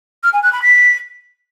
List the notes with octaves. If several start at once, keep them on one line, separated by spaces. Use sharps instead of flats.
F6
G#5
F#6
B5
B6